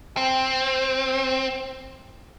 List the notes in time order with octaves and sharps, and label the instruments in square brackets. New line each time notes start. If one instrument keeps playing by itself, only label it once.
[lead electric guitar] C4